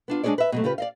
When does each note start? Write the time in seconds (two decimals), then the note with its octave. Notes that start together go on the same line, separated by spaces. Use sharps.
0.08 B3 D4 F4
0.23 G#3 D4 D#4 G#4 C#5 D5
0.38 B4 E5
0.52 B2 F#3 A3
0.64 C#3 F4 G4 B4
0.78 D5 D#5 F5